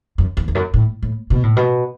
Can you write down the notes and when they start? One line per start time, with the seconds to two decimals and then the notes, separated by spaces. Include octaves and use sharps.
0.18 F#2
0.37 E2
0.48 E2
0.55 F#2
0.74 A2
1.03 A2
1.30 B2
1.43 A2
1.56 B2